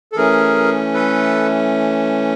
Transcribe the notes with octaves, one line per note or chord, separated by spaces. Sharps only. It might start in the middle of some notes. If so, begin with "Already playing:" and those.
A4
E3 A3 C#4 G#4 A#4
A4 B4